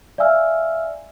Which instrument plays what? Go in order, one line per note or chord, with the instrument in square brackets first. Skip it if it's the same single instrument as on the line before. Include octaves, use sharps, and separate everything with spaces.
[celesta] D5 E5 F5 G#5 E6 F6